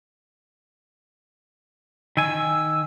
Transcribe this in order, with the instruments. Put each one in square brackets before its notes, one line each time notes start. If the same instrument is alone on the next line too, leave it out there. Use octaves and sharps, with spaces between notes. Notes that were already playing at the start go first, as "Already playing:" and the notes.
[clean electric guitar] D#3 G#5 [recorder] E6